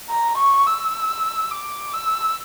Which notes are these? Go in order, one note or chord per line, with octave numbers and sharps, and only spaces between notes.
A#5
C#6
E6
D6
E6